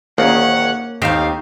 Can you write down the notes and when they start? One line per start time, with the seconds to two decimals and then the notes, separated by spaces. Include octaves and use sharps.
0.18 A#1 D#2 D#3 A#3 C#4 C#5 F#5
1.02 D#2 D#3 C4 G4 C5 F5